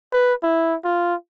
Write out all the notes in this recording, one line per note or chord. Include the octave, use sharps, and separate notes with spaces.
B4
E4
F4